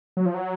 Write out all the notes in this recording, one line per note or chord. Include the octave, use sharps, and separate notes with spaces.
F#3
F3
F#3